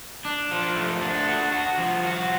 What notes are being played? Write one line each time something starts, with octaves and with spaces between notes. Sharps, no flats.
D4
F3
A3
D4
F#4
F#4
F3
F#4